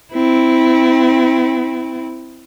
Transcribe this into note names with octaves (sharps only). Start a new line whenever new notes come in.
C4 E4